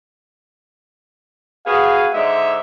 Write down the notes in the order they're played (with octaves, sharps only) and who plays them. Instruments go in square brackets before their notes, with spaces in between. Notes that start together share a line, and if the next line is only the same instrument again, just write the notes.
[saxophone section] B3 F#4 G#4 [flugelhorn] F5
[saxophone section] G#2 D3 G#3 [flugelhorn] E5